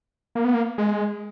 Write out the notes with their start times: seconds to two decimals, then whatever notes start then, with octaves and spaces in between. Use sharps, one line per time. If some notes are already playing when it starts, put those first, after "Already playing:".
0.35 A#3
0.45 B3
0.54 A#3
0.78 G#3